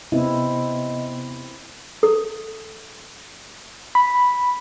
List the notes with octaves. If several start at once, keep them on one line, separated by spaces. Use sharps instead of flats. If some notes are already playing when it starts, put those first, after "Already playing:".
C3 B3 C4 E4 D#5
A4
B5